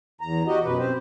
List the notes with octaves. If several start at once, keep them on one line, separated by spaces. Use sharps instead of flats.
E2 A#5
F#4 G4 D#5
F#2 B2 B4
C4 G4 C5